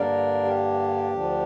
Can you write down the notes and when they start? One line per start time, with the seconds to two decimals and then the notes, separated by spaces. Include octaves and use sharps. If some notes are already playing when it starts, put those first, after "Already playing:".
Already playing: G2 D3 A#3 D4 A#4 D5
0.45 G4
1.11 D2 D3 F3 D4